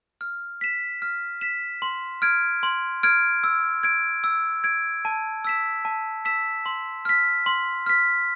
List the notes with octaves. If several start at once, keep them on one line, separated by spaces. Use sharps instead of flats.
F6
B6 E7
F6
B6 E7
C6
F6 G#6 D7
C6
F6 G#6 D7
E6
G#6 D7
E6
G#6 D7
A5
E6 B6 E7
A5
E6 B6 E7
C6
F6 B6
C6
F6 B6